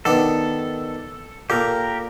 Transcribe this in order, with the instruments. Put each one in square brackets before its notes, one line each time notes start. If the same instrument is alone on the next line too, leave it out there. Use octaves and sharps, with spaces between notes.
[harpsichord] D#3 B3 D4 [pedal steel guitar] A4
[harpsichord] A#2 A4 [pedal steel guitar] G4 A#4